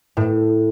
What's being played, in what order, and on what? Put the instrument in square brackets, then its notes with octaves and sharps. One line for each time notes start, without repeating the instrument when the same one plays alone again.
[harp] A2